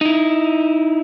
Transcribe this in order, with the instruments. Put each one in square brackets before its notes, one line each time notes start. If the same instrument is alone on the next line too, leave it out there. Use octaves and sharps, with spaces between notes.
[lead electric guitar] D#4 E4